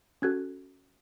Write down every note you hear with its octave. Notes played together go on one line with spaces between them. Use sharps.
C#4 F#4 A4 F#6 G#6